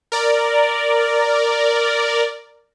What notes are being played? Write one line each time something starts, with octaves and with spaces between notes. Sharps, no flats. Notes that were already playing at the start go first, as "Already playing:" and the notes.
A#4 D5